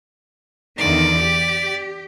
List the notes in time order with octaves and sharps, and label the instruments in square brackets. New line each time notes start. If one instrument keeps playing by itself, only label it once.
[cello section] E2 D3 D#3 [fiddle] D5
[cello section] G4